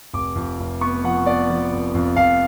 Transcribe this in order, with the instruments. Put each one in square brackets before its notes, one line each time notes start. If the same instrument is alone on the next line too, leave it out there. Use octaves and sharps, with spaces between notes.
[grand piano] F1 D6
F2
F1
B3 C#6
F3 F#5
B3 D5
F3
F1
F2
F2 F5